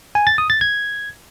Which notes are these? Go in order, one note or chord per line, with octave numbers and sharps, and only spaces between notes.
G#5
A6
D#6
A6
G#6